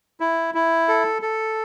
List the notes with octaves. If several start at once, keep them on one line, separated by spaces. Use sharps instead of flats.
E4
E4
A4
A4